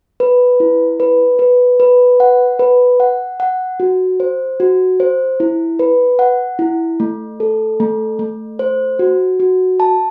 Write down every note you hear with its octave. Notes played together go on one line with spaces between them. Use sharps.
B4
E4
B4
B4
B4
F#5
B4
F#5
F#5
F#4
C5
F#4
C5
E4
B4
F#5
E4
A3
A4
A3
A3
C5
F#4
F#4
A5